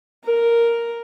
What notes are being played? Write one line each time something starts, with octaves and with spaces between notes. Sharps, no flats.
A#4